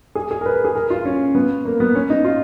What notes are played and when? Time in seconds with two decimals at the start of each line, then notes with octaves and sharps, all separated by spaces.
0.15 G#4
0.31 G#4
0.41 A#4
0.46 B4
0.65 G#4
0.76 A#4
0.90 F4
1.05 C#4
1.35 B3
1.65 A#3
1.80 B3
1.95 C#4
2.10 D#4
2.25 F4